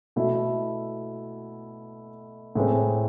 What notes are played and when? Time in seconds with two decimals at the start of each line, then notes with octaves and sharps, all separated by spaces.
0.16 B2 A3 E4 A4
2.55 A2 G#3 C4